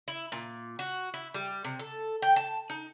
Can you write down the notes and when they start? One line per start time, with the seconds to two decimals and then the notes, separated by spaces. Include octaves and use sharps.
0.08 E4
0.32 A#2
0.79 F#4
1.14 E4
1.34 G3
1.65 C3
1.79 A4
2.22 G5
2.36 A5
2.70 D#4